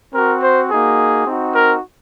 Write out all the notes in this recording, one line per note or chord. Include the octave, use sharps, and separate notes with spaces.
C4 F#4 A#4
C5
A#3 D#4 F#4 G#4
C4 D#4 F#4
A#4